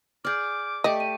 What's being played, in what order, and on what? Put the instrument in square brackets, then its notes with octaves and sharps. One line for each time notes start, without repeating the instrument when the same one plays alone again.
[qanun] G#4 D5 [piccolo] D6 [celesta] F6 G6
[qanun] A3 G4 D5 [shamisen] D#5
[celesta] D#7